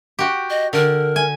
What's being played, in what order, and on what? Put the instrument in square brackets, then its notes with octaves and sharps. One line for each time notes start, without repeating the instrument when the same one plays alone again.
[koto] F#4 G4
[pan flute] D#5
[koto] D3 [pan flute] A#4
[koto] G#5